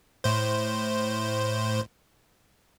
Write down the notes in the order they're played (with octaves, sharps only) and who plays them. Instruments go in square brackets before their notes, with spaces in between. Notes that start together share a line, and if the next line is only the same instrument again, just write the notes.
[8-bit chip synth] A2 C5